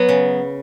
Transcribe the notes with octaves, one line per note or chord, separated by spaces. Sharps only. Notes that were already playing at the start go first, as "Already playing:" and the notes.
Already playing: F#3 B3
C#3